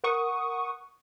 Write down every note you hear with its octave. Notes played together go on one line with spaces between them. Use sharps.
A#4 F#5 C#6 D#6